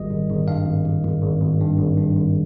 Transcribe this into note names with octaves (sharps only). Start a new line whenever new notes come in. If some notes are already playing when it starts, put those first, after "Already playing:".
Already playing: G#1 G3 D#5
G#1
G#1
G2 F5
G#1
G#1
G#1
G#1
G#1
G2
G#1
G2
G#1